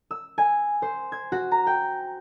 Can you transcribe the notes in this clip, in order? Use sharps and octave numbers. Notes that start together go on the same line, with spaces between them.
E6
G#5
C5
G#6
F#4
A#5
G5